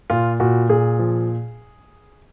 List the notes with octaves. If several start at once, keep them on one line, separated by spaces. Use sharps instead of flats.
A#2 F4
A#2 F#4
A#2 G#4
F3